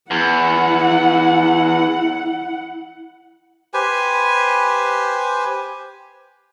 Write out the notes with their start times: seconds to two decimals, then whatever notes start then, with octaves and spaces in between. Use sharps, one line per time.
0.11 E2 E4 F#5
3.74 G4 B4 C5 G#5